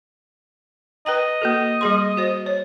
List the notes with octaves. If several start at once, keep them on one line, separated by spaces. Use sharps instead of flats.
B4 D#5 G5 A#5
A#3 F#4 A4
G3 G#4 C6
F#4 C5
C#5